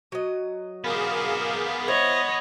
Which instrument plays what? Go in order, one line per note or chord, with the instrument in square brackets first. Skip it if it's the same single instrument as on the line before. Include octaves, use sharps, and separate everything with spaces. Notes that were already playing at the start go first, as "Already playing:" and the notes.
[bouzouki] F#3 D#5
[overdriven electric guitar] B3 G4 [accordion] G#4 A#4 F5
[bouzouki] E4 C5 [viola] C#5 D#5